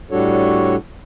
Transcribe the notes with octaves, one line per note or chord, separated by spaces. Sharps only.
A2 G3 D4 F#4 A4 C#5